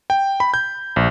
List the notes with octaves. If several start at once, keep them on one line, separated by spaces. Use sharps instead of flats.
G5
B5
G6
A#1